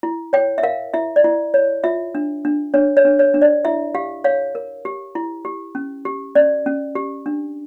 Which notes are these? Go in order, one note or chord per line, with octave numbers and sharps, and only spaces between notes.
E4
C#5 G5
E5
A#4 F5
E4 E5
D5
E4
C#5
F4 E5
D4
D4
D4 C#5
C#5
D4
C#5
D4
D5
E4 E5
G4 F5
C#5 F5
A#4
G4
E4
G4
C#4
G4
C#4 D5
C#4
G4
D4